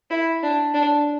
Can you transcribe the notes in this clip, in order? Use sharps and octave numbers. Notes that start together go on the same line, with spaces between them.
E4
D4
D4